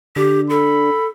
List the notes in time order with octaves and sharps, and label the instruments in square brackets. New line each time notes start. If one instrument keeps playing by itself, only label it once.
[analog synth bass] D3 [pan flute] G4
[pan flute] A4 [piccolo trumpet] B5